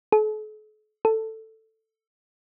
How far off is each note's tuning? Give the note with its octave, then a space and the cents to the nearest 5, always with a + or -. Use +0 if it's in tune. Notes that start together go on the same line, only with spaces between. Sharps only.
A4 -45
A4 +10